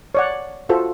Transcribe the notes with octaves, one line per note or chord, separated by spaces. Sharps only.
C#5 D5 F#5
F4 F#4 A4 C5